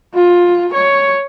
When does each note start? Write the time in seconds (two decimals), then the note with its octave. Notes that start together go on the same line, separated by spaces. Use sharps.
0.14 F4
0.73 C#5